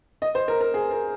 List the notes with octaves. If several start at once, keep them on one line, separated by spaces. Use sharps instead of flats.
D#5
C5
A#4
A#4
G#4
A#4